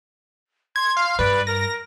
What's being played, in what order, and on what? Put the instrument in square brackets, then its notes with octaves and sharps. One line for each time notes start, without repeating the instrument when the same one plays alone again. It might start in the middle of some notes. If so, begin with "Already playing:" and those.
[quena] C6 [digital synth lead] G#6
[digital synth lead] F5
[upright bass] G2 [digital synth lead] B4 [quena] D5
[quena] A#4 [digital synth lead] A#6